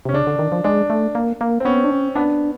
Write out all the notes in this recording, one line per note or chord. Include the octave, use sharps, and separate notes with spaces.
C3 C#4
C#3 D4
D3
D#3
F3
G#3 D4
A3
A#3
A#3
C4
B3 C#4
D4
C#4
B3 D4